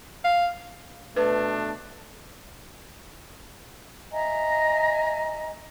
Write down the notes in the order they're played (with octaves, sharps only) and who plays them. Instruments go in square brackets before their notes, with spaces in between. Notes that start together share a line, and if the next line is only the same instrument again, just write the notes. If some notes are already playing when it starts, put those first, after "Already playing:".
[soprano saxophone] F5
[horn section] B2 A3 D4 [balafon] B4
[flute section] D#5 E5 G#5 A#5